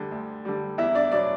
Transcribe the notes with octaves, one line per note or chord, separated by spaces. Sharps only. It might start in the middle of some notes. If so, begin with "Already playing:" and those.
Already playing: D2 D3 G3
D2
D3 G3
E2 E4 E5
D4 D5
B2 F#3 D4 D5